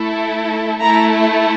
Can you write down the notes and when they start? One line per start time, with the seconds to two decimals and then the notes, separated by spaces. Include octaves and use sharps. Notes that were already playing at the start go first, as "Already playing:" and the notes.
Already playing: A3 E4 A4
0.80 A3 E4 A4 A#5